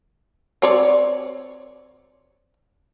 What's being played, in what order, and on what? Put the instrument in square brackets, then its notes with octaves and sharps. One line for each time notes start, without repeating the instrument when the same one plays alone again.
[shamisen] C4 C#5 D5